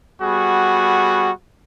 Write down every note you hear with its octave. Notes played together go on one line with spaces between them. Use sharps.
G3 B3 F#4 G#4